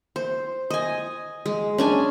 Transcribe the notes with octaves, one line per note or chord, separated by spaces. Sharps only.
C5
D#5 G#5
G#3
C#4 D4 G#5